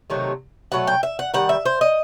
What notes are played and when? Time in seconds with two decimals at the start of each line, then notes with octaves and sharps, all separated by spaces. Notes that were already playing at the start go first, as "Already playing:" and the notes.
0.10 C3 D#3 F#3 A3
0.72 B2 F#3 A3 F#5
0.87 G5
1.03 E5
1.19 F#5
1.34 D#3 G3 F#5
1.49 E5
1.66 C5
1.81 D#5